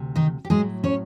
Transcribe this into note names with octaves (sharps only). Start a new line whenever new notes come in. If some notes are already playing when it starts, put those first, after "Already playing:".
Already playing: D2 C3
D#3 D#4
G4
A2 F#3 G#3 G#4
C#4 C#5